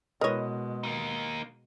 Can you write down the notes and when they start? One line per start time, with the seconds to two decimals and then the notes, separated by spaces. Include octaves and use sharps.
0.21 B2 G#3 E4 A#4 B4 C#5 D#5
0.83 A#3 D#4